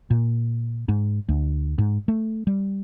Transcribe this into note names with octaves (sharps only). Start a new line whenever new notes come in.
A#2
G#2
D2
G#2
A3
G3